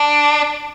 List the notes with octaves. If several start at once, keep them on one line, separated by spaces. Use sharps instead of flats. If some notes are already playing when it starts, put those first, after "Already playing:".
Already playing: D4